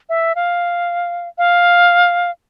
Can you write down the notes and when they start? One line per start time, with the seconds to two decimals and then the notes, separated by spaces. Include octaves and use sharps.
0.09 E5
0.35 F5
1.38 F5